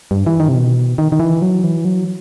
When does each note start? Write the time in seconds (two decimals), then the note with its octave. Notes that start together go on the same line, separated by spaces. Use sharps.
0.11 G2
0.26 E3
0.40 D#3
0.49 C3
0.55 B2
0.98 D#3
1.12 D#3
1.20 E3
1.42 F#3
1.64 E3
1.85 F#3